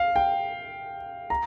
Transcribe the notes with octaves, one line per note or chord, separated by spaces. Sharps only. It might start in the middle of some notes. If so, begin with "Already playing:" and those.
Already playing: F5
G5
A#5